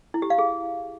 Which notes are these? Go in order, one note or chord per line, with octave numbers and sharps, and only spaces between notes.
E4
G4
F5
G#4